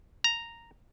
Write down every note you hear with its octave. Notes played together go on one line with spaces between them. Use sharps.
A#5